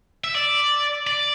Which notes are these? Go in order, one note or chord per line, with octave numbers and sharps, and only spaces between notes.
E5
D5
D5